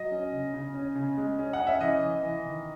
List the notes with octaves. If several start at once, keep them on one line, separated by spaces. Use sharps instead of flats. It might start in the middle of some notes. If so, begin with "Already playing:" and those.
Already playing: F#3 D#5
C#4
C#3
C#3
C#4
C#3
G#3
C#4
F#5
C#4
E5
E3 D#5
E3
E3
D#3